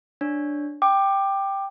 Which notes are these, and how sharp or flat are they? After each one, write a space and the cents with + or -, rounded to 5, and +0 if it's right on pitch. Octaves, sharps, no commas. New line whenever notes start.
D4 +0 C#5 +0
G5 +0 D6 +20